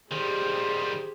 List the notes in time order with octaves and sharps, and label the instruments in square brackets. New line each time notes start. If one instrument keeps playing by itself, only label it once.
[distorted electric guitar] D#3 G3 [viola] G4 G#4 [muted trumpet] C5